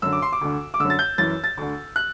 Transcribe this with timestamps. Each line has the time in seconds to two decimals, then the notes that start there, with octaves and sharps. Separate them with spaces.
0.02 F#2 D3 E6
0.12 D6
0.22 C6
0.32 D6
0.41 D2 D3
0.74 D6
0.80 F#2 D3 E6
0.90 A6
0.99 G6
1.18 F#2 E3 A6
1.44 A6
1.57 D2 D3
1.96 F#6